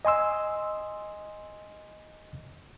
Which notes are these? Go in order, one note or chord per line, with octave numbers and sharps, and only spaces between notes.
D#5 G#5 C6 E6